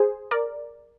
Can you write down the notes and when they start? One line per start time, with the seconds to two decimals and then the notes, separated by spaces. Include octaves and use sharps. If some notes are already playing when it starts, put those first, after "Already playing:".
Already playing: G#4 C5
0.31 A#4 D5